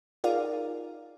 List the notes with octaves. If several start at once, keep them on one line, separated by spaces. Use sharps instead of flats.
D#4 F4 G#4 A#4 D5 F5